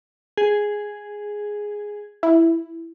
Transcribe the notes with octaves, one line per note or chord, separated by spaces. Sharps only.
G#4
E4